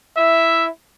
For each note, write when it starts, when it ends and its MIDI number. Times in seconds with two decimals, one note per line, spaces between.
0.17 0.68 64
0.17 0.68 76